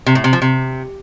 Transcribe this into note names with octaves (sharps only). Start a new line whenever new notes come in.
C3
A2
C3
F3
C3